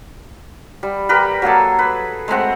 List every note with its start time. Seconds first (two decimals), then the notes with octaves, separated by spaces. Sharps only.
0.83 G3
1.09 G4 A#4 B4
1.42 F#3 A#3 G#4 A4
1.79 B4
2.28 G#3 A3 C4 F#5